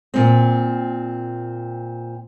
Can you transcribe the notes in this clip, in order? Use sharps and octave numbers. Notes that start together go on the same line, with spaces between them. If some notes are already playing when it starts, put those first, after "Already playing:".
A#2 C4